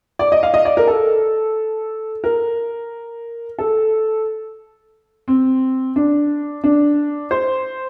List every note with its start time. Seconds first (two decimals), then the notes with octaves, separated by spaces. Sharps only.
0.19 D5
0.32 D#5
0.43 F5
0.54 D#5
0.65 D5
0.77 A#4
0.87 A4
2.24 A#4
3.58 A4
5.28 C4
5.96 D4
6.64 D4
7.31 C5